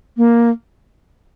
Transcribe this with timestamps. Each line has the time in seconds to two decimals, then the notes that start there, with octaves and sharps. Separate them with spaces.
0.17 A#3